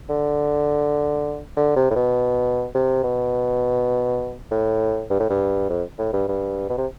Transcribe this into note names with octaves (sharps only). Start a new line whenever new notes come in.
D3
D3
C3
A2
B2
C3
B2
A2
G2
A2
G2
F2
A2
G2
G2
B2
C3